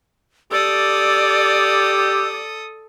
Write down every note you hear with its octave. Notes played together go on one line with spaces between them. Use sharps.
G4 A4 D5 D#6 E6